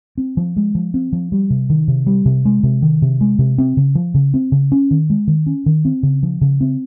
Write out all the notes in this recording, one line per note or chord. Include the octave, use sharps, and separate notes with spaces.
C4
F3
G#3
F3
C4
F3
G3
C3
D#3
C3
G3
C3
G#3
C3
D#3
C3
G#3
C3
C4
C#3
F3
C#3
C4
C#3
C#4
D#3
G#3
D#3
C#4
D#3
C4
C#3
F3
C#3
C4